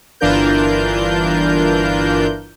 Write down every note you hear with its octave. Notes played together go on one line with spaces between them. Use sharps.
G1 E3 D4 F4 A#4 G6